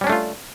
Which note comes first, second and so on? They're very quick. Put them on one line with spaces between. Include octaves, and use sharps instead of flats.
G3 C#4 D4 A3 F4